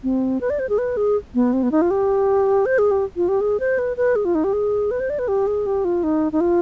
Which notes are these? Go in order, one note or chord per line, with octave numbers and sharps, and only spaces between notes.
C4
B4
D5
C5
G#4
B4
G#4
B3
C4
B3
D#4
F4
G4
C5
G#4
G4
F4
G4
G#4
C5
B4
B4
G#4
F4
D#4
G4
G#4
B4
C5
D5
B4
G4
G#4
G4
F4
D#4
D#4
F4